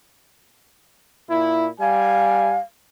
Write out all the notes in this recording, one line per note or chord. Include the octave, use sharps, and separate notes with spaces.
A#2 E4
G3 F5 G#5